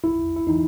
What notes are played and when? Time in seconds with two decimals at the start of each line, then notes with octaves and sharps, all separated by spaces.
0.03 A#1 E4
0.36 E4
0.47 E3 D#4